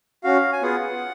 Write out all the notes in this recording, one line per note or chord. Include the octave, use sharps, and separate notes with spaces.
C#4 F#4 F5
G#5
B3 F4 G#4 F#5